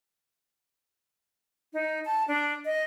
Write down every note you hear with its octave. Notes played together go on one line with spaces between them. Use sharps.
D#4
A5
D4
D#5